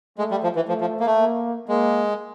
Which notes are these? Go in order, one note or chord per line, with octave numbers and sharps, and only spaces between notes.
G#3 A3
G3
F3
E3
F3 A3
F3
A#3
A3
A#3
G#3 A#3